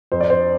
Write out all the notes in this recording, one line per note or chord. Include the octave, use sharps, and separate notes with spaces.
F2 C5
D5
C5